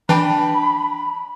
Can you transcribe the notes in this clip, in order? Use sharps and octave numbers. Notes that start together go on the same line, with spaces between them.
E3 D4 G5 A5 B5